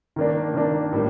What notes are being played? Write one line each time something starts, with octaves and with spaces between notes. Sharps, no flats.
D#3 A#3 D4
D#3 A#3 D4
A2 G3 A#3